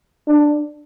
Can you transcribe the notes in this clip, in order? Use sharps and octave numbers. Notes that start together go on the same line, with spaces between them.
D4